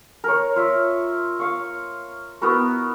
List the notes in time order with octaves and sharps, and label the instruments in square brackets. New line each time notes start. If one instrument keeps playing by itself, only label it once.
[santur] A#4 C#5
F4 E5
F5 C#6
B3 E4 F#4 A#4